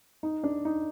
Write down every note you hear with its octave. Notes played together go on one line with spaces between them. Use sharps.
D#4
D4
D#4